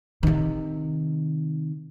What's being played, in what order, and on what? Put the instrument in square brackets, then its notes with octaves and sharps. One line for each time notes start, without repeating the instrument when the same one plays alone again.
[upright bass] C3 D#3